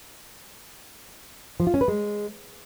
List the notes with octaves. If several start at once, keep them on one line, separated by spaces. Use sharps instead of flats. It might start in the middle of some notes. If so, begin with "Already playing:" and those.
F3
F4
C#4
B4
G#3